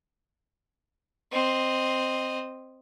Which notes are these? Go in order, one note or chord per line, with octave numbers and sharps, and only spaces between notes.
C4 D#5